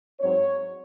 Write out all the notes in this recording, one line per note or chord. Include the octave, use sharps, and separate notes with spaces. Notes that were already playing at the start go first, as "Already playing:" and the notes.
G#2 F#3 C4 C#5